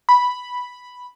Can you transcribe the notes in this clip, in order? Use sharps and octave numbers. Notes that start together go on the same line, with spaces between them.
B5